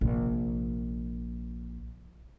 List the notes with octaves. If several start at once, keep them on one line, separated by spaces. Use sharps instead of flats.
A#1 C3